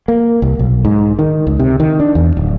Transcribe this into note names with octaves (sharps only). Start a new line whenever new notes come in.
A#3
C2
B1
G#2
D#3
C#2
C3
D#3
D4
E2
D1